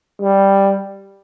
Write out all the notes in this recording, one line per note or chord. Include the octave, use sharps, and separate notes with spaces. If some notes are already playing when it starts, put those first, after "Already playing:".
G3